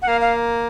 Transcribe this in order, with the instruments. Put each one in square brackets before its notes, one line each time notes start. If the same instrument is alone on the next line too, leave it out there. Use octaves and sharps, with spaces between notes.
[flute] F#5
[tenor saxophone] A#3 [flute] F5
[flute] F5